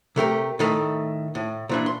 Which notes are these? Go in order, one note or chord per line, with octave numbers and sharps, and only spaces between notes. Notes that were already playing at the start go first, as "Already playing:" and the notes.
C3 A3 G4 A#4
A2 D#3 A3
A2
A#2 E3 D4
C6